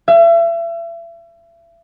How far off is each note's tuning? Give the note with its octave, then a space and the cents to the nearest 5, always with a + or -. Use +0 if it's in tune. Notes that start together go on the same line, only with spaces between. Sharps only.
E5 +35